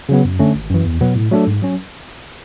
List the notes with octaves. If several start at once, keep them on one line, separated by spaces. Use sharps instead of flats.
C#3 F#3 B3
F#2
D3 A3 C#4
G#1
F#2 E3
E2
B2 F#3 B3
A2
F#3 A3 D4 A4
G#2
F#3 C#4